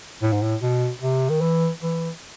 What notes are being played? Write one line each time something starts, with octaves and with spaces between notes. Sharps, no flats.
A2
G#2
A2
B2
C3
D#3
E3
E3